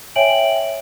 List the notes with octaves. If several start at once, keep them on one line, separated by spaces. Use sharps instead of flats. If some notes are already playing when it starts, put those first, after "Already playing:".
C#5 E5 G5 G#5 D7 F#7